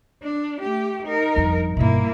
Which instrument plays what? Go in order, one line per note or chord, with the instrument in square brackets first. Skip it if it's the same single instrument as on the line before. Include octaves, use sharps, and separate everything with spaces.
[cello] D4
A3 G4
D#4 A#4
[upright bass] G1 F2
[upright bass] G2 B2 [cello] A#3 E4